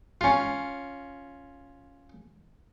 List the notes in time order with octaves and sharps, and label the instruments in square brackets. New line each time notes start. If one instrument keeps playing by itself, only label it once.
[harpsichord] C#4 F4